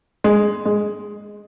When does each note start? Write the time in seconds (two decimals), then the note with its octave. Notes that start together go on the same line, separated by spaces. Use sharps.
0.24 G#3
0.65 G#3